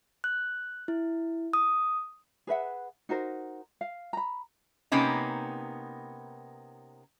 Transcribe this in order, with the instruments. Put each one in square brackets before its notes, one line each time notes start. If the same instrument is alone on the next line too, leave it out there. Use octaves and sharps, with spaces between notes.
[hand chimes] F#6
E4
D#6
[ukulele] G#4 B4 E5 F#5
D#4 F#4 A#4 C5
F5
A#5 B5
[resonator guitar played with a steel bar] C3 A#3 B3 C#4 D#4